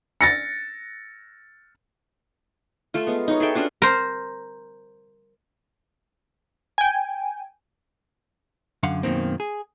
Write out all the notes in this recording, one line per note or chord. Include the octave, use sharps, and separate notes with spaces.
A6 A#6 C#7
A3 F4
G#3 B3
D#4 F#4 C#5
G#4 A4 E5 G5
C#4 D4 F4 F#4
A#4 C5
G5 G#5
F#2 D3 F5 F#5 C6
F#2 B2 D#3 A#3 C4
G#4